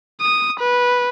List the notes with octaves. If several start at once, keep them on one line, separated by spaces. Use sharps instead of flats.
D#6
B4